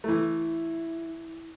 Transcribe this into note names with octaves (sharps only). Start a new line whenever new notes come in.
E3 A3 E4